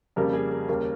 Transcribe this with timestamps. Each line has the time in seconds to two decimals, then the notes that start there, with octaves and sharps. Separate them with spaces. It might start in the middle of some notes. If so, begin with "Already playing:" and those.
0.16 F2 C#3 G3 A#3 A#4
0.33 G#4
0.52 A#4
0.69 D#2 C#3 G3 A#3 A#4